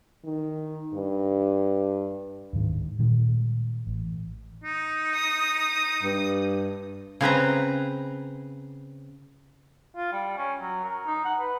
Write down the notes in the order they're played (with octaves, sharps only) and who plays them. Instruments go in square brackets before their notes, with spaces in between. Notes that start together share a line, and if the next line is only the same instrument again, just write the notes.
[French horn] D#3
G2
[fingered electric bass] D1 G#2 D#3 G#3
A#2 D#3 G3 G#3
A1
[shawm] D#4
[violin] D#6
[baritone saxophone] G2
[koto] C#3 C4 B4 A#5
[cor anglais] F4
G3
C#4
F#3
A#4
D#4
F#5
B4